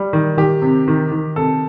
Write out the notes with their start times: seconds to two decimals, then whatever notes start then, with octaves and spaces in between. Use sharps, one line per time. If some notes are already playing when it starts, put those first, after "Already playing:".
Already playing: G3
0.13 D#3
0.37 D#3 G4
0.62 C3
0.88 D#3
1.12 D#3
1.36 C3 A4